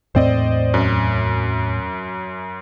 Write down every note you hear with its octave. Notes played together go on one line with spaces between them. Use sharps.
E2 A2 C4 C5 D5 D#5
F#2